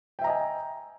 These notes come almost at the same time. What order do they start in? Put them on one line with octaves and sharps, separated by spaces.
G5 E5 A#5 D#5 G#5